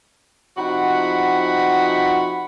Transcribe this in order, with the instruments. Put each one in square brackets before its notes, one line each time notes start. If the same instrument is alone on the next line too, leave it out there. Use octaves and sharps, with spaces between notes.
[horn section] C3 F3 D#4 F#4 F#5 B5